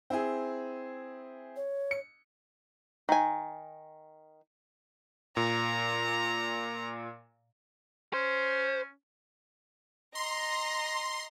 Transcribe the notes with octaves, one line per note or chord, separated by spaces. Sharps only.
C4 E4 G#4
C#5
C#7
D#3 G#5
A#2 A#5
C#4 C5
D#5 A#5 C6